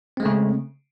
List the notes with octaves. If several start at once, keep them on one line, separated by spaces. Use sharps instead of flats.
C#3 G#3 A3 C4